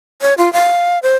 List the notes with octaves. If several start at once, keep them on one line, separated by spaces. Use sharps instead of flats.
C#5
F4
F5
C5